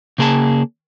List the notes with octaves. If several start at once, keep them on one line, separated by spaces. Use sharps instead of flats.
C#3 A#3 G#4 C5 A5